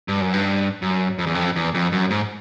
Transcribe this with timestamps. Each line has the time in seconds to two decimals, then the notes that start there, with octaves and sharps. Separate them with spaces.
0.08 G2
0.21 F#2
0.34 G2
0.82 F#2
1.18 F2
1.27 E2
1.35 F2
1.56 E2
1.74 F2
1.92 F#2
2.10 G#2